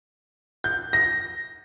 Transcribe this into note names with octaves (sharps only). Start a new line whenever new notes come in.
G6
A#6